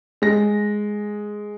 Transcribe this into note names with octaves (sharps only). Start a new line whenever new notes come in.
G#3 A#6